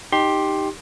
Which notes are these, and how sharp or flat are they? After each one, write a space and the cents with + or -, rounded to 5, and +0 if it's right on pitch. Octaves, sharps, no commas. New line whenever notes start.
D#4 +0 G4 +0 C6 +20